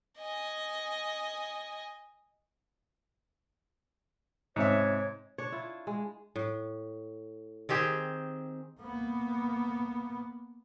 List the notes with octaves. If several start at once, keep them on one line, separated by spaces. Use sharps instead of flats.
D#5 G#5
G#2 C3 C#5 E5
D4 C#5
E4 F4
G#3
A2
D#3 C4 G4 G#4
A#3 B3